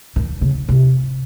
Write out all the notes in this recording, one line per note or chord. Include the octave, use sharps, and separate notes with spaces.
D#3
C#3
C3